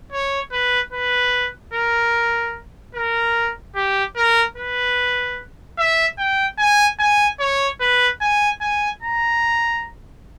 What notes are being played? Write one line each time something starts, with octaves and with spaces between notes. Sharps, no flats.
C#5
B4
B4
A#4
A#4
G4
A#4
B4
E5
G5
G#5
G#5
C#5
B4
G#5
G#5
A#5